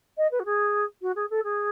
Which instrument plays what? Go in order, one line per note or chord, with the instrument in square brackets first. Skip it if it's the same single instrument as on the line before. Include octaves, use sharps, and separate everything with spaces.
[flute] D#5
B4
F#4
G#4
F#4
G#4
A4
G#4